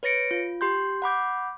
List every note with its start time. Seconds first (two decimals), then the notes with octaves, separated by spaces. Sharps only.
0.03 B4 C#5 A6 A#6 C#7 D7
0.31 F4
0.61 G4 C6 G6
1.02 F#5 B5 D6 G6